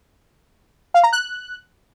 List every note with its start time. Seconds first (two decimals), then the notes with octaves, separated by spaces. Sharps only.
0.94 F5
1.03 A#5
1.13 F#6